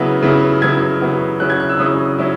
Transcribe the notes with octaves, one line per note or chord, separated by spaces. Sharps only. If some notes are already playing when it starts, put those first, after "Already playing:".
Already playing: C#3 F#3 B3 E4
C#3 F#3 B3 E4
C#3 F#3 B3 E4 G#6
C#3 F#3 B3 E4
C#3 F#3 C#4 E4 F#6
G#6
F#6
E6
C#3 F#3 C#4 E4 D#6
F#3 C#4 E4